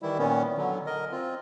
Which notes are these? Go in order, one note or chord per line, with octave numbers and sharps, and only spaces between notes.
D#3 E3 G3 E4
A#2 D#3 B3 C#4
D3 F#3
A#4 D#5
C4 F4